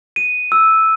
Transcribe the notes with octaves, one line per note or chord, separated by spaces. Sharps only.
D#7
E6